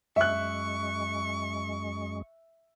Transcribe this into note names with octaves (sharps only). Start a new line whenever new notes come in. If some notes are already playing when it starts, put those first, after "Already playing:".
F#2 G#3 E5 C#6 F#6